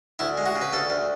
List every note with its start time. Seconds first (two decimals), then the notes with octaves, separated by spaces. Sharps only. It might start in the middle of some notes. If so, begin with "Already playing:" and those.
0.19 D2 E4
0.37 G#3
0.46 F#4
0.56 C#3
0.62 B4
0.73 D2 A4
0.90 D2